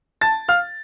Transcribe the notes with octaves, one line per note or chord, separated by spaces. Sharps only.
A5 A6
F5 F6